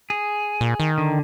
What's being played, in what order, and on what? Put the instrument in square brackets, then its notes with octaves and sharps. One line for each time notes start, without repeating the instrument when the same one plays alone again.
[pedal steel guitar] G#4
[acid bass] A#2
D#3
[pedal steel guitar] D3